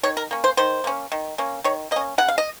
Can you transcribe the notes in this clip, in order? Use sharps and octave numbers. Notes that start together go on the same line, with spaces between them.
D#3 C#5
A#4
A#3 C#4
C5
D#3 C5
A#3 C#4
D#3
A#3 C#4
D#3 C#5
A#3 D#5
C#4
C#3 F#5
F5
D#5